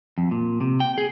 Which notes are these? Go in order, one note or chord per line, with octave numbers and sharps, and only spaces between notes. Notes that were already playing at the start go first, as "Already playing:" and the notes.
F2
A#2
C3
G5
G#4